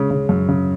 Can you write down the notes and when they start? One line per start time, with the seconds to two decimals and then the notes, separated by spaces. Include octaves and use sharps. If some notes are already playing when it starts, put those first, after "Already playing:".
Already playing: C#3 G#3
0.11 C#3
0.29 F#2
0.49 C#3